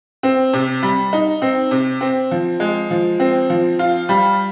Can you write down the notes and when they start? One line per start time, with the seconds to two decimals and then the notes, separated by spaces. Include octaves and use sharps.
0.23 C4
0.53 C3
0.82 G3
1.13 D#4
1.42 C4
1.71 C3
2.01 C4
2.31 F3
2.60 G#3
2.90 F3
3.20 C4
3.50 F3
3.79 F4
4.09 G3